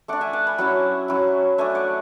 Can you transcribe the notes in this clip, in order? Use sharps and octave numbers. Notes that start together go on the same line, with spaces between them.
A3 D4 D5 F#5
E5 G#5
F#5 A5
G#5 B5
F#3 C#4 E4 F#5 A5
F#3 C#4 E4
A3 D4 E5 G#5
D5 F#5